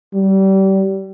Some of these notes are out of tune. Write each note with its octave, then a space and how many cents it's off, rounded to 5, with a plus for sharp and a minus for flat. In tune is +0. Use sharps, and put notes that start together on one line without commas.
G3 -30